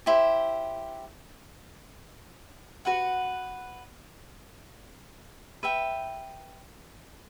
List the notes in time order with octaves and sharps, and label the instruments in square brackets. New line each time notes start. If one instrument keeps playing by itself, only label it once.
[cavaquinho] E4 G4 C5
F#4 B4 F#5
B4 E5 G5